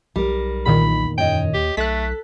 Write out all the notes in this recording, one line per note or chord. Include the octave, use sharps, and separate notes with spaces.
B1 G3 A#4
E2 A#2 D#3 B5
F#2 C#5 D#5 G5
D#2 G4
B1 A3 A4 F#6 B6